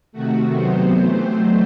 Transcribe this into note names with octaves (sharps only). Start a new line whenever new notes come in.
C3 D#3 A3 F#4
C3 F#3 B3 C5
C3 E3 A3
F#3 A3